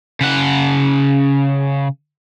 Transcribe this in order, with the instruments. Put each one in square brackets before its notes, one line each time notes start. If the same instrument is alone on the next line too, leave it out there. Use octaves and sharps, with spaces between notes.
[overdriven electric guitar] C#3 F#5